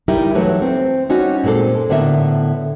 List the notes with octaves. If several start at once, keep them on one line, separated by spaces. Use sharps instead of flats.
G3 D#4 E4 G4 A#4
E3 F#3 A3 B4 C#5
C4
G3 C#4 D#4 F#4
A#2 G3 G#3 C4 A4
A2 D3 B3 A4 A#4 E5